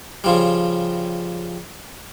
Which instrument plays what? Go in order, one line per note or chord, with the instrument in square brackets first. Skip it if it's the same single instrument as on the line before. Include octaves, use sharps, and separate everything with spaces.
[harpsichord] C#3 F3 G3